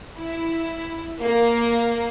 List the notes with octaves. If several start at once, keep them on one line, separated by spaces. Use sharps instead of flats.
E4
A#3